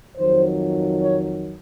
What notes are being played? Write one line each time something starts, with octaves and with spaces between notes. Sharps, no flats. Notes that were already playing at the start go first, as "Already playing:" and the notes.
F2 D#3 F#3 C5
C#5